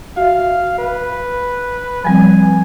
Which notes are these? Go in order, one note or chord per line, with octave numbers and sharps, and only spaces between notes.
F#4 E5 F5
B4
F3 G3 C4 G#5